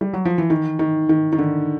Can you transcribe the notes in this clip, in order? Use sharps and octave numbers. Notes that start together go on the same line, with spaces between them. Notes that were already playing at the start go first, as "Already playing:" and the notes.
G3
F#3
F3
E3
D#3
D#3
D#3
D#3
D3